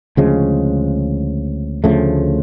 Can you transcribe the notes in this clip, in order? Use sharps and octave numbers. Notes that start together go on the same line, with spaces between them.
D2 C#3 F3 G#3
D2 C#3 F3 A3